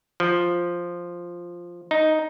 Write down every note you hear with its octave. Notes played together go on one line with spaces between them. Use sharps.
F3
D#4